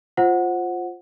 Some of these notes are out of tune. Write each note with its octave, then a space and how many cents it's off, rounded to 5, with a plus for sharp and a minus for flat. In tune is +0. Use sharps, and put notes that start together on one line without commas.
F4 +5 C5 +15 F#5 -10